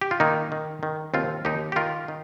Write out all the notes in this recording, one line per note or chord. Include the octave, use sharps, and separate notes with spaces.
G4
F4
D#3 A#3 D#4
D#3
D#3
D#2 C4 F4
D#2 D#4 G4
G4
D#3 F4 A#4
D#3